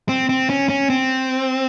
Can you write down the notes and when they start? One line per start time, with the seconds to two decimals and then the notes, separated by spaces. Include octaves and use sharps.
0.09 C4
0.29 C4
0.50 C#4
0.69 C#4
0.90 C4